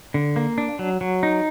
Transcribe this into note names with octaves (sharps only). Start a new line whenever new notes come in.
D3
A#3
D4
F#3
F#3
D#4